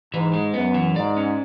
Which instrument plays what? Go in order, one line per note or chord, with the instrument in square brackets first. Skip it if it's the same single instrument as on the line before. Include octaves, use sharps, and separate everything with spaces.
[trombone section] G#2 [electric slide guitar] E3
[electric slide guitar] G#3
[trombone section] F#2 [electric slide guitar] B3
[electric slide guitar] E3
[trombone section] G#2 [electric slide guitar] D5
[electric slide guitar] C#4